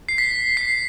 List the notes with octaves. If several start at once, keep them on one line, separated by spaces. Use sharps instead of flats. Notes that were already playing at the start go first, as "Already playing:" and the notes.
C7
B6
C7